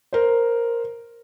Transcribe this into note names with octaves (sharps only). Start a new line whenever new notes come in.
A#4 C5